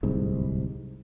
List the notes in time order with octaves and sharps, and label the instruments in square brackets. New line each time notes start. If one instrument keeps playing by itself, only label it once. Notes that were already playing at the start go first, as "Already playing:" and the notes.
[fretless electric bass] D1 C2 G#2